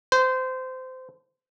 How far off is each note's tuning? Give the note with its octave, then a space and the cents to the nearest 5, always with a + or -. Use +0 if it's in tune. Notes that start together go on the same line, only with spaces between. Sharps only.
C5 -20